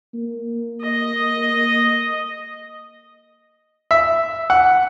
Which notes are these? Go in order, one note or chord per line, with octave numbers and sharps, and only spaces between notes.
A#3
D#5
E5
F#5